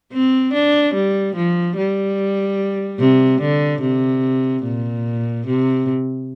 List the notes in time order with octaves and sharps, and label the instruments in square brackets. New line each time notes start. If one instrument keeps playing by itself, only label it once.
[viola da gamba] C4
D4
G3
F3
G3
C3
D3
C3
A#2
C3